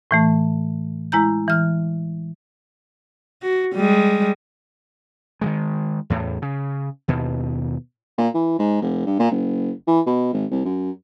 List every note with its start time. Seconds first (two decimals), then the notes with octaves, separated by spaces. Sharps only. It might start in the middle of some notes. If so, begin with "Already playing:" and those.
0.11 A2 E3 A3
1.12 G#3 E4 A#5 G6
1.48 E3 F6
3.42 F#4
3.74 G3 G#3
5.41 D#3 E3 G#3
6.10 E2 A2
6.42 C#3
7.08 D#2 B2
8.18 A#2
8.34 E3
8.59 G#2
8.82 F1
9.06 G2
9.19 A#2
9.31 F#1
9.87 E3
10.06 B2
10.33 G#1
10.51 C2
10.65 F#2